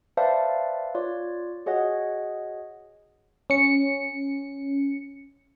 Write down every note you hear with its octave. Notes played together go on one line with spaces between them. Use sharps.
B4 C5 D5 E5 F5 A5
F4 C#5 D5
F#4 G#4 C#5 D#5 F#5
C#4 C#7